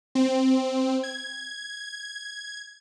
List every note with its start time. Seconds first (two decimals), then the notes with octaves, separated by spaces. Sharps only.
0.15 C4
1.03 G#6